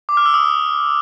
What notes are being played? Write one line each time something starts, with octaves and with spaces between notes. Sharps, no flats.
D6
F6
E6
D#6